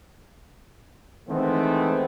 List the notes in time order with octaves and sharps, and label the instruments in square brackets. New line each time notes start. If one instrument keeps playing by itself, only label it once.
[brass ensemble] D#3 E3 G#3 A3 B3 C4